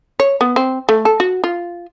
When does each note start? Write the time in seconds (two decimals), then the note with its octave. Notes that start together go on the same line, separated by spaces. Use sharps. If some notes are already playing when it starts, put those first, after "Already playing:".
0.20 C#5
0.41 B3
0.56 C4
0.89 A3
1.05 A4
1.20 F#4
1.44 F4